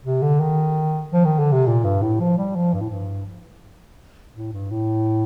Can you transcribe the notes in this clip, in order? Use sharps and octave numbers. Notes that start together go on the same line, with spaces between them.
C3
D3
D#3
F3
D#3
D3
C3
A#2
G2
A2
F3
G3
F3
G2
A2
G2
A2
G2
A2